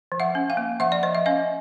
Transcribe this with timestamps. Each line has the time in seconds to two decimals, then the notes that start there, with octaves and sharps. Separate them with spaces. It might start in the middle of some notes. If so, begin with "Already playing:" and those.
0.12 F3
0.20 E5 F#5
0.35 C#4
0.50 F5 G5
0.57 A#3
0.80 F3 E5 F#5
0.92 D5
1.03 F3 D#5
1.15 E5
1.26 C#4 D#5 F5